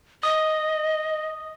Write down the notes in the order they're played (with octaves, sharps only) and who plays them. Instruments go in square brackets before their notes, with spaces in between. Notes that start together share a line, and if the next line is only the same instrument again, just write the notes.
[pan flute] D#5 [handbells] D#6